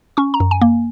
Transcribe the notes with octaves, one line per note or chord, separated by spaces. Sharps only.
C#4 C#6
A#5
F#2
G#5
A#3